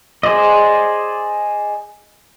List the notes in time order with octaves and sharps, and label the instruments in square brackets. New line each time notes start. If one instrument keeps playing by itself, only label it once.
[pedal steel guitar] G#4 C5 D5 D#5